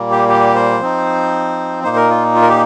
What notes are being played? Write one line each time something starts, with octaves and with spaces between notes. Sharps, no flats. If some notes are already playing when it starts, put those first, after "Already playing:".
Already playing: A#2 G3 A#3
G4
G4
C5
F3 C4 D#4
A#2 A#3 D#4 C5
A#4
F4
F4
A#4
G4